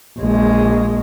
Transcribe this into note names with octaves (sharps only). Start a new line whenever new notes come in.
A#1 G#3